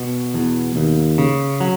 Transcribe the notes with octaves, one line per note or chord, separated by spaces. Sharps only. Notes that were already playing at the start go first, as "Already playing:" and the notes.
Already playing: B2
E2
D#2
C#3
F#3